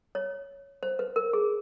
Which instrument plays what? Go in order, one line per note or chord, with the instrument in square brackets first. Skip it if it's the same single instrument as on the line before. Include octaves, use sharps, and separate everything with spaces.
[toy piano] C#5
C5
B4
A#4
G#4